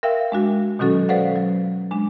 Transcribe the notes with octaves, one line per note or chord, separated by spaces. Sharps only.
A#4 E5 F5 G5 E6
G#3 D4 F#4
B2 D#3 F#3 C#4 F#4 A4
A4 B4 C5 D5 F5 F#5
F#3
G#3 D4